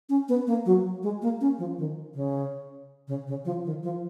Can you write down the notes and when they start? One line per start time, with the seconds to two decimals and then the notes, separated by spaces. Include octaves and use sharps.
0.09 C#4
0.29 B3
0.47 A#3
0.66 F#3
1.03 G#3
1.22 A#3
1.41 C#4
1.59 F3
1.78 D#3
2.15 C#3
3.08 C#3
3.27 C#3
3.45 F3
3.65 D#3
3.83 F3